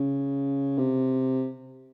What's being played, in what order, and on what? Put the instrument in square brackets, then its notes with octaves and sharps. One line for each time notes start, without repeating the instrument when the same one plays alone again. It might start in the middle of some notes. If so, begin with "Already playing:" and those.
Already playing: [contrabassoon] C#3
C3